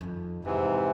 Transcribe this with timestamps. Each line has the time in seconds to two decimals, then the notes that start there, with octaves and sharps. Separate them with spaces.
0.01 F2 D#3
0.45 F2 G#2 C3 E3